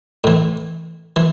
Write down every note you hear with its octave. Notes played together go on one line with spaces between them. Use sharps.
A2 E3
E3